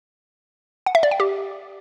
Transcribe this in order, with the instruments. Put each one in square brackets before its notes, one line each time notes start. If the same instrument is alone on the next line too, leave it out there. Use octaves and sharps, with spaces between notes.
[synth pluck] F#5
E5
D5
G5
G4